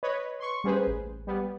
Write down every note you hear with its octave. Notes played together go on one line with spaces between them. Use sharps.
B4 C#5 D#5
C6 C#6
G3 A#3 C#4 G#4 B4 C5
A1
G3 B3